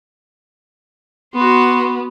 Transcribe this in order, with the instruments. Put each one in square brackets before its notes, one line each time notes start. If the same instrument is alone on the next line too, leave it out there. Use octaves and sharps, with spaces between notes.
[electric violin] B3 [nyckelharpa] F#4 C6